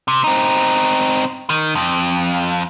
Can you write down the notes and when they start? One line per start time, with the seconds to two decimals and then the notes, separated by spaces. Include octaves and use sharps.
0.08 C3
0.24 C4 D#4
1.50 D#3
1.75 F2